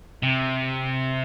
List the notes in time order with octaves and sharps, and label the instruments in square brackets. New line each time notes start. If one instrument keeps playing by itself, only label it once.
[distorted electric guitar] C3